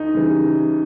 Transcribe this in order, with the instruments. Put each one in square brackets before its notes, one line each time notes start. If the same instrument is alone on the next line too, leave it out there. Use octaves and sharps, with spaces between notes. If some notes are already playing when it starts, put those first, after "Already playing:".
Already playing: [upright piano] D2 [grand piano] D#4
[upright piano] C#3 E3 G3